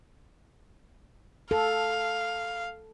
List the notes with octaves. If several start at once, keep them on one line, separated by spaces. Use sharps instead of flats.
A4 F5